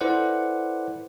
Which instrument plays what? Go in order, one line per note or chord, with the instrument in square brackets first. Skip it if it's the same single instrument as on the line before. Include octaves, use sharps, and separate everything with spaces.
[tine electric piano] E4 A4 B4 C5 D5 F#5